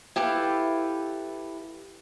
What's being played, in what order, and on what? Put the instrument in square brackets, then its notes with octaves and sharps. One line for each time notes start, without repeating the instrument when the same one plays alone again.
[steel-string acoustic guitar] E4 G4 A4 B4 F5